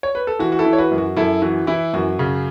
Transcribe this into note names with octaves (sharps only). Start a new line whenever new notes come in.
C#5
B4
A4
E3 F#4
F#4
E4 A4
E3
C#5
F#4 B4
F#2
F#4
F#2 E4 A4
E3 F#4
E3 E4
F#2 F#4
C#3